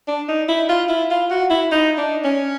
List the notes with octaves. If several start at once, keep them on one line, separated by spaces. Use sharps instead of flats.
D4
D#4
E4
F4
E4
F4
F#4
E4
D#4
D4
C#4